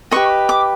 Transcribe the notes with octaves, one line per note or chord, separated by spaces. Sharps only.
G4 B4 D#5 C#6
D6